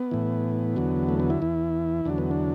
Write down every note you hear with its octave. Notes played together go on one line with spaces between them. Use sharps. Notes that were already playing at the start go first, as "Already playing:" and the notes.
Already playing: B3
A2 E3
E2 D3 F#3
A3
B3
E4
E2 E3
E2 D3 F#3 D4
B3
D4